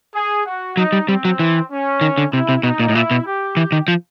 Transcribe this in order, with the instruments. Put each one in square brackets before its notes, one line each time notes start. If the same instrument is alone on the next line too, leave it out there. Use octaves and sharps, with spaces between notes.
[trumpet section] G#4
F#4
[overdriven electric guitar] F#3 [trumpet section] D#4
[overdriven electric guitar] G3
[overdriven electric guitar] G3 [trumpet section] C4
[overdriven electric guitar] F#3
E3
[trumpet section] C#4
[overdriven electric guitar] D#3
D3
[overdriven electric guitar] C3 [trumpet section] E4
[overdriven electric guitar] C3
[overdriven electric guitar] B2 [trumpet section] D#4
[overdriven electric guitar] A#2
A2
[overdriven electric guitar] A#2 [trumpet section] E4
[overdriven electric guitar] B2
[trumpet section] G4
[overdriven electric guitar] E3
D#3
F3